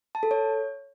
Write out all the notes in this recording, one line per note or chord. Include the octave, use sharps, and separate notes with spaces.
A5
A4
C#5